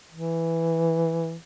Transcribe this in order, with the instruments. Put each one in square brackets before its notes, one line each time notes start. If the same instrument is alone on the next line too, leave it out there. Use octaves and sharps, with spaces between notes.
[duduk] E3